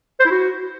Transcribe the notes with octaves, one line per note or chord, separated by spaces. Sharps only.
C5
E4
F#4